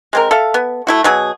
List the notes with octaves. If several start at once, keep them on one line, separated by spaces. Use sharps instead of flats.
G#3 C4 A#4
A4 E5 F5
B3
A3 E4 F#4
B2 F#3 G#4